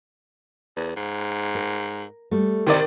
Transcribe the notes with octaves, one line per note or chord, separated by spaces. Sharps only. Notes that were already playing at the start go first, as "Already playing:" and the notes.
E2
G#2
A#4
G3 A3
C3 D#3 D5